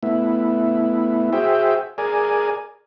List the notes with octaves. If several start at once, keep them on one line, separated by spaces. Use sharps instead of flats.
A3 B3 E4
F#4 G#4 C5 E5 G5
G#4 A#4 D5 G#5